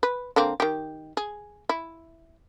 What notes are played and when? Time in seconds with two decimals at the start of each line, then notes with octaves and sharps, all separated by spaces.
0.03 B4
0.36 D3 A#3 C4
0.60 D#3 G4
1.17 G#4
1.69 E4